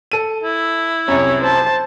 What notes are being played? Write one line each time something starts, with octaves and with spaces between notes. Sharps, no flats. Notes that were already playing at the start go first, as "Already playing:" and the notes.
A4 D#7
E4
C2 F#2 C#5
C5 A5